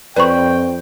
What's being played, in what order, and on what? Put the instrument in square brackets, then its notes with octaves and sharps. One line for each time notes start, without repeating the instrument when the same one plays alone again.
[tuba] F2 [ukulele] B4 C5 B5 [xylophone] D5 C#6 [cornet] G5